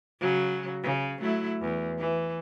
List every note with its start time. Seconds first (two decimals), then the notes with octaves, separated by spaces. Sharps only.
0.20 C#3 F#3
0.83 C#3
1.20 F#3 A3 E4
1.61 E2
1.98 E3